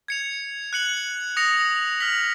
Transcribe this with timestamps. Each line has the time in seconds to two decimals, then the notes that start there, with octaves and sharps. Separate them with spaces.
0.08 G#6 C#7 F7
0.73 F#6 C#7 F#7
1.37 D#6 A#6 C#7 F7
2.00 F6 B6 F#7